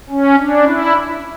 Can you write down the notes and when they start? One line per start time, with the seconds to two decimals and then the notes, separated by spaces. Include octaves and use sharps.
0.10 C#4
0.39 D4
0.67 E4